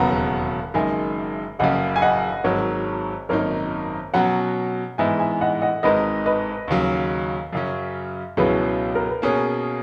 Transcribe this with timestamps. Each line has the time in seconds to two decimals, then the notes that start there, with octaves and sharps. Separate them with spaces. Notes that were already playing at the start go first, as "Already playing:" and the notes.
Already playing: E1 D#2 C#3 F#3 B3 F#5 A#5
0.74 F#1 F#2 D#3 G#3 E5 G#5
1.59 F#1 F#2 C#3 D#5 F#5
1.96 G#5
2.02 D#5 F#5
2.44 G#1 G#2 F#3 A#4 C#5
3.29 G#1 F#2 D#3 A#3 D#4 A#4 C#5
4.14 B2 F#3 C#4 F#5 A#5
4.98 G#2 E3 G#3 B3 E5 G#5
5.19 E5 G#5
5.41 D#5 F#5
5.62 D#5 F#5
5.83 G#1 G#2 D#3 G#3 B4 D#5
6.26 B4 D#5
6.68 D#2 C#3 F#3
7.53 F#2 C#3 F#3 C#4
8.37 C#2 B2 F#3 C#4 E4 G#4 B4
8.95 A#4
9.09 B4
9.22 B2 A#3 C#4 G#4 A#4 C#5